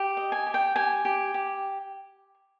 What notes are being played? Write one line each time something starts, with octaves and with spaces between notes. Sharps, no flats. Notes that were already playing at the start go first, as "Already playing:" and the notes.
Already playing: G4
D#5
G#5
G4
G5
G4 G#5
G4
G4